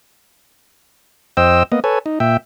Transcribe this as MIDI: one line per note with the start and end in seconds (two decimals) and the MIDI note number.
1.37 1.63 41
1.37 1.63 72
1.37 1.63 75
1.37 1.63 79
1.37 1.63 88
1.72 1.80 58
1.72 1.80 59
1.72 1.80 75
1.84 1.99 69
1.84 1.99 71
1.84 1.99 73
1.84 1.99 80
2.06 2.19 63
2.20 2.37 46
2.20 2.37 76
2.20 2.37 79